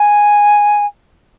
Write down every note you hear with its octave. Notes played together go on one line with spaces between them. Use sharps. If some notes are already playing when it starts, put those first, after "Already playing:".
Already playing: G#5